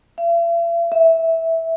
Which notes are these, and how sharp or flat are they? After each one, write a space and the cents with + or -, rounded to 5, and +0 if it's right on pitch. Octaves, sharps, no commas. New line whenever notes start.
E5 +45
E5 -10